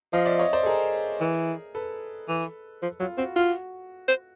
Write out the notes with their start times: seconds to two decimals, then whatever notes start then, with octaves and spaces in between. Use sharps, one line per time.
0.13 F3 D#5 F5
0.26 D5 E5
0.39 C#5 D#5
0.53 C5 D5
0.63 A4
0.66 G#4 A#4
1.20 E3
1.75 A4 B4
2.28 E3
2.82 F3
3.00 F#3 F4
3.18 C4 F#4
3.36 F4 F#4
4.08 C5